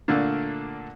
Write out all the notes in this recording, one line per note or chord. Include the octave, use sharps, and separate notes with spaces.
A#2 D3 A3 A#3 D4